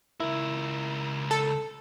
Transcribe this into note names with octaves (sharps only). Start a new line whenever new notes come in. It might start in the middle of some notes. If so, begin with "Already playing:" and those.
C#2 E4 A#4
A4